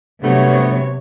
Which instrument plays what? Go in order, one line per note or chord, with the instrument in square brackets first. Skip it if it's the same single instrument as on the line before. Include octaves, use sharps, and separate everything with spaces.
[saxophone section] G2 A3 B3 [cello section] C3 F#3 C#5